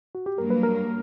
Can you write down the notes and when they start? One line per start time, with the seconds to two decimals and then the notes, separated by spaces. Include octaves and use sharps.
0.15 F#4
0.26 G4
0.38 G2 F#3 A#3 A#4
0.50 B4
0.63 A#4